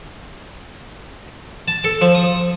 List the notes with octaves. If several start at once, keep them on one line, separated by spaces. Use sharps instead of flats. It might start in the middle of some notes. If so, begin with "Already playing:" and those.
A5
A4
F3
D#6